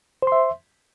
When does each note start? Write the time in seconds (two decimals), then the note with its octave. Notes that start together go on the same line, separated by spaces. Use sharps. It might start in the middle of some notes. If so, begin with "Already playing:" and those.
0.22 C5
0.27 C6
0.32 E5